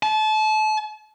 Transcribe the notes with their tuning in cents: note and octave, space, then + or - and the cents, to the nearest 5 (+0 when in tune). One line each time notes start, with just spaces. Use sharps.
A5 -30